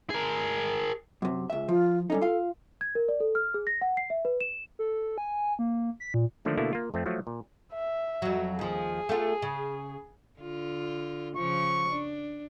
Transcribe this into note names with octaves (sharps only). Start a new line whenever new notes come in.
G#4 A#4
F#2 C3
C#2 E5
F3 F4
G3 C#4 D#4 A4
F4 F5
G#6
A#4
D5
A4
F6
G#4
A#6
F#5
C7
E5
B4
E7
A4
G#5
A#3
B6
A#2
D3 D#3 F3 A3 A#3
B2 D3 A3 A#3 E4
A#3 F4
F2 A3 C4
F3 F#3 A3 F#4
A#2
E5
F2 F#3
D#2 F3 G#4
A3 B3 F4
C#3
D3 F4
C#3 F3 C#6
D4